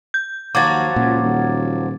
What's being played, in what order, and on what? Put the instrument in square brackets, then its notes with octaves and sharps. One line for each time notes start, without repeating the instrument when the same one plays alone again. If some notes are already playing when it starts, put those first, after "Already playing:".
[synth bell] G6
[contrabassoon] D#2 [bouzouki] F3 F#3 F#4 [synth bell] D6 G#6 A6
[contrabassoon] C#2 [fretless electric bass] A#2
[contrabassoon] D#1